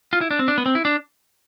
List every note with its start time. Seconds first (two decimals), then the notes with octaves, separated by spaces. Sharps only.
0.13 F4
0.21 E4
0.31 D4
0.39 C4
0.48 D4
0.58 B3
0.66 C4
0.75 E4
0.85 D4